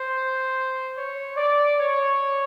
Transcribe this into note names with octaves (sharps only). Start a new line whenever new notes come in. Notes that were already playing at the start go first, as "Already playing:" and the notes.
Already playing: C5
C#5
D5
C#5